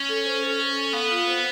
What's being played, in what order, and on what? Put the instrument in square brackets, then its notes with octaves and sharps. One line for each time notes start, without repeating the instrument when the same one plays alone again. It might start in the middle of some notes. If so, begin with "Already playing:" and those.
Already playing: [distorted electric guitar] C#4
[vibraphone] A4
C5
A4
A4
A4
[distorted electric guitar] B3 [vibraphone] F5
[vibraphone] F4
C5